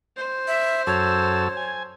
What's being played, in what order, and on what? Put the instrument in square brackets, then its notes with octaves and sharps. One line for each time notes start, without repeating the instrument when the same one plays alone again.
[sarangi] C5
[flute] E5
[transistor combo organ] F#2 A4 E6 [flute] C#5
[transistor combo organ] G#5